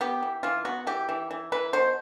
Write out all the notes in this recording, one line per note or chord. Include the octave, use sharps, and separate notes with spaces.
B3 G4
E3
E3 F4
B3 F#4
E3 G4
E3
E3
E3 B4
B2 C5